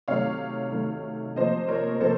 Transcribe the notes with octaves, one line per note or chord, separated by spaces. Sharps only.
C3 D#3 F#3 A3 C#5 F5
C3 D#3 F#3 A3
C3 F3 A#3 C5 D#5
A#4 C#5
C3 F3 A#3 A4 C5